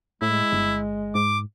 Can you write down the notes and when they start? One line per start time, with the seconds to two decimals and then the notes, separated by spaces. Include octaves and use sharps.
0.22 A2 G#3 E4
0.52 G1
1.15 G#2 D6